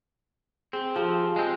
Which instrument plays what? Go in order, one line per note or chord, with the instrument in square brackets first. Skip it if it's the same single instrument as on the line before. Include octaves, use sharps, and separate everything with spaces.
[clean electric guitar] C4 [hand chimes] G#4
[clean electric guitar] F3 [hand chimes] F4 G4 G#4
[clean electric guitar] G#3 C4